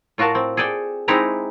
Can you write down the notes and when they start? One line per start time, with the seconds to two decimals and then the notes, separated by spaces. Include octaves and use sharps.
0.18 A2 F4 F#4 A#4 A5
0.35 C4
0.57 G#4 A4 D5 G5
1.08 G#3 C4 D#4 E4 G4 A#5